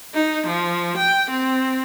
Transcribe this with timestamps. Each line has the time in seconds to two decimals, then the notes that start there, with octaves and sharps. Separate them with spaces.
0.14 D#4
0.46 F3
0.97 G5
1.30 C4